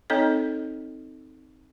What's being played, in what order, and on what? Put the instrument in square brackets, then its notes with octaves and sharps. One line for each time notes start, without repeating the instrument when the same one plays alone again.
[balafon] C4 D#4 A4 C#5 D#5